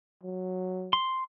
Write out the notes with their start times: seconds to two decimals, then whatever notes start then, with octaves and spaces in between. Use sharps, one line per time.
0.23 F#3
0.93 C6